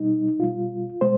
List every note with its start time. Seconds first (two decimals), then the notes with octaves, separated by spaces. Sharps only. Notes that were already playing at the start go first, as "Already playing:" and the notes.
Already playing: B2 G3 D#4
0.39 B2 G3 F4
1.01 B2 G#3 C5